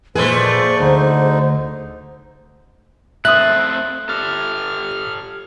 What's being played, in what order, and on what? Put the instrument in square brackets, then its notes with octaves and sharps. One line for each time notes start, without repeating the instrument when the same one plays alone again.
[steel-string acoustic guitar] A#2 B4 [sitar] F3 A3 G#4 [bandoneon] G#3 [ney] C5
[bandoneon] D5 C#6
[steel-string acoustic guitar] D2 [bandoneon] D3 D#4
[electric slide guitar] A3 C4 [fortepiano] E5 D#6 [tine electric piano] F#6
[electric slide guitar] G4 A4 [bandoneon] F6